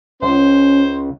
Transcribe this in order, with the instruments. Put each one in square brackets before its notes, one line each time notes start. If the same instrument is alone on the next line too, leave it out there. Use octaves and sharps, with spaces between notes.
[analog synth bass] C#2 [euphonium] C#4 [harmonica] C5